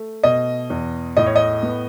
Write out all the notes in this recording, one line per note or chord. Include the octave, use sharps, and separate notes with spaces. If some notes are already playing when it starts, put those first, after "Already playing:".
Already playing: A3
B2 D#5
E2
A2 D#5
C#5
D#5
B3